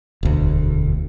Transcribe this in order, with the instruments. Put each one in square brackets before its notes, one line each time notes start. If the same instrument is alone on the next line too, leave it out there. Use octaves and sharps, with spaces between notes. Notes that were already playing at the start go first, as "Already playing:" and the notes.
[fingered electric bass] E1 D2